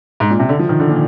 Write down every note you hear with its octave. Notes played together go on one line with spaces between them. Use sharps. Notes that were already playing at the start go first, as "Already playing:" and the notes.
G#2
A#2
C3
D3
F3
D#3
D3
A#2